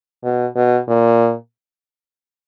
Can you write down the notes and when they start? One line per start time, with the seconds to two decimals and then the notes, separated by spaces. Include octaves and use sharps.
0.23 B2
0.56 B2
0.88 A#2